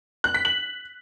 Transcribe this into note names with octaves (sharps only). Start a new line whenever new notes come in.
F#6
B6
F#7